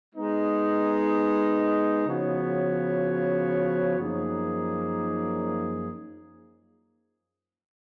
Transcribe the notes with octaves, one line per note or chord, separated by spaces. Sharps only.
G#3 B3 D#4
C#3 F3 B3 F#4 C#5
F#2 F3 A#3 D#4 G#4